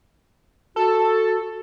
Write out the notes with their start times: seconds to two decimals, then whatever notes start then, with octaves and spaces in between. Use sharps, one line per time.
0.76 F#4 A4